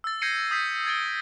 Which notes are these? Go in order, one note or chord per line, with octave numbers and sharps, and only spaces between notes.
E6 A6
G6 G#6 A#6 C7 C#7 D#7
D#6 G6 B6 C7
G#6 A6 D7 G7